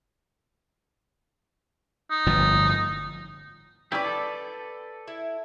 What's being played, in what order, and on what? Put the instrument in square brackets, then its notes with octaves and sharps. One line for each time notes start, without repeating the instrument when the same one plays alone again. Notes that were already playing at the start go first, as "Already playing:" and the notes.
[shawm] D#4
[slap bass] G1 A2 F3
[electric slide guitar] C#4 E4 G4 [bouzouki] B4 D5
[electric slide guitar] A4
[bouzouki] E4